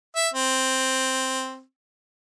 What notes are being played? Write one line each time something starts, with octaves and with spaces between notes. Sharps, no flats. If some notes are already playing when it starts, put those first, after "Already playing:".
E5
C4